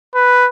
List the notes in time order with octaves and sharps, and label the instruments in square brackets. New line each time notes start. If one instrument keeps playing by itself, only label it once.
[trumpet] B4